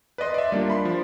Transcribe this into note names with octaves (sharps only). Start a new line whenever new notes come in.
B4 D5 D#5 C6
D5 E5
G3 A#3 D4 F4
B5 C6
F3